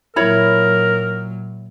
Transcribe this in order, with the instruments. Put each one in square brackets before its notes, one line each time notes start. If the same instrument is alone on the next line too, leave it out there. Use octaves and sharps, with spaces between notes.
[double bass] A#2 F#3 [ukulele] E4 C#5 B5 [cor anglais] A#4